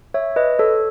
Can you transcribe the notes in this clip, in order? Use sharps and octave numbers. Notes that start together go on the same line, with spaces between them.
C#5 E5
B4 D#5
A4 C#5